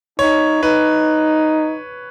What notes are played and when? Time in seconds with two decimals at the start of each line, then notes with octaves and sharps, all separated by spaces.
0.19 D#4 C#5
0.63 D#4 B4